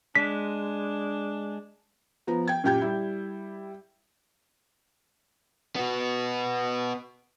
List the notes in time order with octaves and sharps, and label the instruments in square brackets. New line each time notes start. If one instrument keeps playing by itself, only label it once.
[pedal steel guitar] G#3 [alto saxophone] D4 [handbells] B6
[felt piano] F3 B3 A#5
G5 G#6
F#2 A#2 G4 G5 G6 G#6
G3 E4
[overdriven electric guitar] B3 F#4